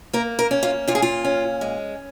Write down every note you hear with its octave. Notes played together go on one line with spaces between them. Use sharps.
A#3 A#4
A#4
C#4
F4
A#2 F4
G#4
F4
C#4
G#3